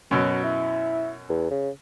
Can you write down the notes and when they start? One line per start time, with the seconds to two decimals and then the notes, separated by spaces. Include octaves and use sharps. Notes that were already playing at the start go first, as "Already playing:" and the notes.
0.11 F#2 B2 F#3
0.44 E4
1.30 E2
1.51 C#3